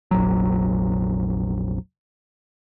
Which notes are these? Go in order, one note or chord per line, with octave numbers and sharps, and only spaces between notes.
F1 A#1 F#3